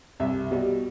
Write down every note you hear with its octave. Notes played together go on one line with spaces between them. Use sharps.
C2 E5
B2 G3